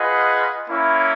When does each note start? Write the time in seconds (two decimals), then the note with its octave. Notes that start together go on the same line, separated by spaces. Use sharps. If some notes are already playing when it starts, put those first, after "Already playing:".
Already playing: F4 G#4 B4 D#5 F#5
0.70 A#3 C#4 E4